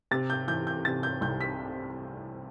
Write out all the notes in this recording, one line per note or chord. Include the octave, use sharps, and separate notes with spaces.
C3 A6
G6
E3 G6
G6
C3 A6
G6
C2 G6
B6